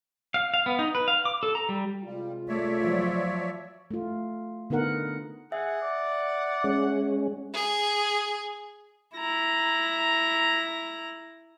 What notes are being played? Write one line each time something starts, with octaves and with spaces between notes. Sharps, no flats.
F5
F5
B3
D#4
B4
F5
D6
A4
A#5
G3
C3 G3 G#3 F4
A3 C#5 D5 E5
F3 F#3
A3 F4
D3 B3 D#4 A#4 F#5
G#4 E5 F#5
D5
G#3 C#4
G#4
E4 A#5